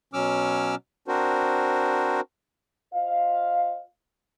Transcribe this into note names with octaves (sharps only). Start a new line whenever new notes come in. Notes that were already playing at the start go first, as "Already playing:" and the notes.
B2 F#3 C#4 D6 E6 F6
C4 D4 F#4 A#4 C5
F4 C5 D#5 F5